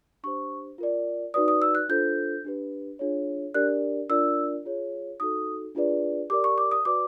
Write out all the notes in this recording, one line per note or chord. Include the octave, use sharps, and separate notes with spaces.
D4 G4 C5 C#6
F4 A#4 D5
D#4 F#4 B4 D5 D#6
D#6
E6
F#6
D4 F4 A4 C5 G6
D4 G4 B4
D4 F4 G#4 C#5
D4 G4 A#4 D5 F#6
D4 F4 A#4 D5 E6
F4 G#4 C#5
D#4 F#4 A4 D#6
D4 F4 G#4 B4 D5
G4 A#4 D5 D6
C#6
D6
D#6
F#4 B4 D5 D6